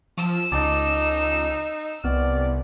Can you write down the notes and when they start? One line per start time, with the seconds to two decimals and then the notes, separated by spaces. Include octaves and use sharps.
0.18 F3 E6
0.52 C#2 D#4 A5 D6 A6
2.04 C2 B3 D5 F6